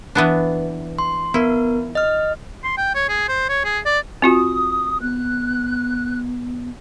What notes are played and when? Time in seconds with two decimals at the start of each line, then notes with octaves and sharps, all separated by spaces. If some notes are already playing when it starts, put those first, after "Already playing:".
0.15 E3 B3 D4
0.99 C6
1.34 B3 E4 A#4
1.95 D#5 F6
2.64 C6
2.78 G5
2.95 C#5
3.09 G#4
3.28 C5
3.49 C#5
3.64 G#4
3.85 D5
4.22 C4 F4 F#4 D#6
5.01 B3 F#6